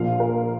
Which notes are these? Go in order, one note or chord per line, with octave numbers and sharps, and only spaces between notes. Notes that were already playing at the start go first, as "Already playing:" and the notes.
Already playing: A#1 A#2 F3 F5
A#4